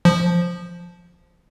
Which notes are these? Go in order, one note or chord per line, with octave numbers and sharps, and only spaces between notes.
F3